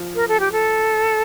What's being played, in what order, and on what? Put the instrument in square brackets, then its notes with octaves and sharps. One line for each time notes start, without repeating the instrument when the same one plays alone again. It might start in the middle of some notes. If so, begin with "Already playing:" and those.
Already playing: [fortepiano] F3
[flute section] A#4
A4
G4
A4